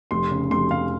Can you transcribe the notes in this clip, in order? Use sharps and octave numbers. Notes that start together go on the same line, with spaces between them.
F1 C6
C#3
F1 C6
F1 F5